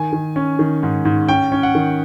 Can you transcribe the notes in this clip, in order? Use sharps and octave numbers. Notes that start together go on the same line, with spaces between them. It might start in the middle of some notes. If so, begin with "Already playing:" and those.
Already playing: D#3 G#5
D#3
C#4
D#3
G#2
G#2
C#4 G5
C#4
F#5
D#3